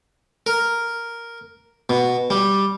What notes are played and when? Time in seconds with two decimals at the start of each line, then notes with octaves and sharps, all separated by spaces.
0.46 A#4
1.90 B2
2.30 G3